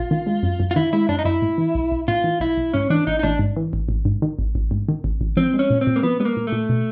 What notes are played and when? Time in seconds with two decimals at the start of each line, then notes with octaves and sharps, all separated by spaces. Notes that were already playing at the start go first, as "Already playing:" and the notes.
Already playing: A#1 F4
0.11 D#3
0.27 G#3
0.43 F#2
0.60 F#2
0.71 F4
0.76 D#3 E4
0.93 G#3 E4
1.09 F#2 D4
1.19 D#4
1.25 F#2 E4
1.42 A2
1.58 E3
1.75 B1
1.92 B1
2.08 A2 F4
2.24 E3
2.40 B1 E4
2.57 B1
2.73 G#2 C#4
2.90 E3 D4
3.07 A1 D#4
3.19 D#4
3.23 A1 D4
3.39 G#2
3.57 E3
3.73 A1
3.89 A1
4.05 G#2
4.22 D#3
4.39 A1
4.55 A1
4.71 G#2
4.89 D#3
5.04 A1
5.21 A1
5.37 F3 C4
5.54 G#3
5.59 C#4
5.70 A#2
5.81 C4
5.87 A#2
5.96 A#3
6.03 F3 B3
6.20 G#3 B3
6.25 A#3
6.37 A#2
6.47 A3
6.52 A#2
6.69 B2